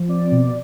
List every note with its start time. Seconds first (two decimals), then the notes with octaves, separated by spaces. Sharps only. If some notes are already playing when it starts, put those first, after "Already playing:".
Already playing: F3
0.08 C4 D5
0.32 B2